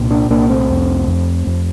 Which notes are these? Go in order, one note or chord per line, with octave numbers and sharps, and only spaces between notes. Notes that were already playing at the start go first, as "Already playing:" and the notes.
Already playing: C2 A#2
A#3 D4
C2 A#3 D4
A3 C4
F2
F2
F2